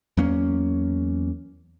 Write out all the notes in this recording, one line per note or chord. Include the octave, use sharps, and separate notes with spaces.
E2 F#3 A#3 C#4